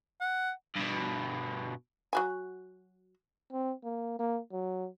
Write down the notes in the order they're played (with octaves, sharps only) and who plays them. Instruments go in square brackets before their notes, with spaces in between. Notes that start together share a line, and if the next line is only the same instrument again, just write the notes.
[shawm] F#5
[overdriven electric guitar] G2 B2
[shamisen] F#3 F#4 G#5
[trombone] C4
A#3
A#3
F#3